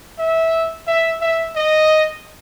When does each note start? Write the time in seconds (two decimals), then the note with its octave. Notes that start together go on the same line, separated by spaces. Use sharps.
0.19 E5
0.87 E5
1.21 E5
1.56 D#5